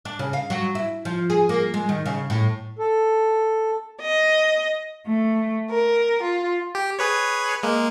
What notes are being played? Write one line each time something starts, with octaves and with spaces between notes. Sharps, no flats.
D4
C#3
F5
F#3
E4
F3
G#4
A#3
G#3
D#3
C#3
A2
A4
D#5
A3
A#4
F4
G4
G#4 B4 C#5
G#3 A#3